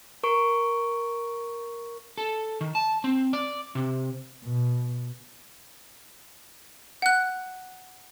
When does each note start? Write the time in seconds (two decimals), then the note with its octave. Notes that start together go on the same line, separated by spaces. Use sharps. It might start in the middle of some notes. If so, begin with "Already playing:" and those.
0.23 A#4 C#6 D7
2.18 A4
2.61 D#3
2.75 A5
3.04 C4
3.33 D5
3.75 C3
4.44 B2
7.02 F#5 F#6